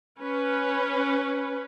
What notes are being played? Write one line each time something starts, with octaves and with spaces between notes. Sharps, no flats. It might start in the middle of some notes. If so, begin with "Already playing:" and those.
C#4 B4